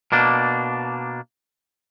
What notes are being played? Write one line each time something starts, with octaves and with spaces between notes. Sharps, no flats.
B2 A#3 D4